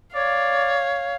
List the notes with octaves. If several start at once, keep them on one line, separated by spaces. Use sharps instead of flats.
C#5 D5 F5